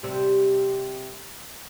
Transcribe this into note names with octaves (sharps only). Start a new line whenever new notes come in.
C3 G3 C4